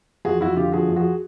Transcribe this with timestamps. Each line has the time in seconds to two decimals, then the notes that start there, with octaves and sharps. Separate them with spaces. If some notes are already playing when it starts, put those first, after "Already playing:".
0.25 F2 F#4 G#4
0.41 F2 E4 F#4
0.56 D3 F4 G4
0.72 F3 F#4 G#4
0.89 F2
0.96 F#4 G#4